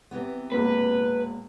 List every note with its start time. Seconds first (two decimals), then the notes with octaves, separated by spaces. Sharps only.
0.11 C3 E3 B3
0.52 E1 A#2 B4